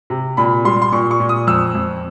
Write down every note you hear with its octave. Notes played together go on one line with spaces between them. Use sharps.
C3
A#2 B5
G3 C6
C6
A#2 C#6
C#6
A#2
D#6
F2 E6
F2